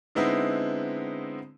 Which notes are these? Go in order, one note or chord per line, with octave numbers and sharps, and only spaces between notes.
D3 G#3 B3 C4 D#4 E4